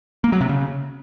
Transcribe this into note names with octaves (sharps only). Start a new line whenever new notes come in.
A#3
F#3
C3
C#3